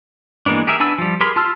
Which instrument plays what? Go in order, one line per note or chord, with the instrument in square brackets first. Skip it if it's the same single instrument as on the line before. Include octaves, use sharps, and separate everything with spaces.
[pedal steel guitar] E3 G#3 A#3 B3 D4
G4 G#4 A#4 E5
B3 D4 G#5 B5 E6
F3 G3
G4 G#4 A#4 B5 C6
F4 A5 C6 E6 F6